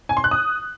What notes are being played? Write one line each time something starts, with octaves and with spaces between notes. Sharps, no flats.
G#5
C6
F#6
D#6